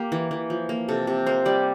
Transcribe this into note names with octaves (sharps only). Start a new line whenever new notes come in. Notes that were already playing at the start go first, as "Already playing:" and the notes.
Already playing: A#3 G4
E3
E3
F3
A#3
C3 A4
C3
A#3 C5
G3 D5